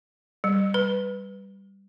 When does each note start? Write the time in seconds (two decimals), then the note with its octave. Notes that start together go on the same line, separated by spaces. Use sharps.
0.44 G3
0.74 B4